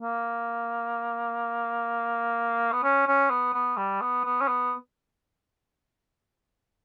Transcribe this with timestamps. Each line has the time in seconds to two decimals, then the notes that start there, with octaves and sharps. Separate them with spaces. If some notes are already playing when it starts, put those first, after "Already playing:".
0.02 A#3
2.73 B3
2.84 C#4
3.07 C#4
3.30 B3
3.54 B3
3.77 G3
4.01 B3
4.24 B3
4.42 C#4
4.48 B3